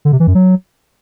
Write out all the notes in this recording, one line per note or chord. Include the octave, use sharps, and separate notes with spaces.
D3
C3
E3
F#2
F#3